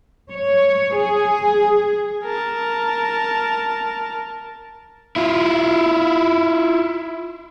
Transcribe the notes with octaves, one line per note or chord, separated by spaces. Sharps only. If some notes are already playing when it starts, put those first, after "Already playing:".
C#5
G#4
A#4 A5
E4 F4